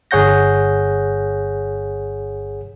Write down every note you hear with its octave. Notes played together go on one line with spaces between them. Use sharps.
G1 G#4 C#5 F#5 G6 A#6